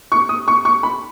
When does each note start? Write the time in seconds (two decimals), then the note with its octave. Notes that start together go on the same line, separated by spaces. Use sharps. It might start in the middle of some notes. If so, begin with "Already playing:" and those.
0.12 C#6
0.29 D#6
0.48 C#6
0.65 C#6
0.83 B5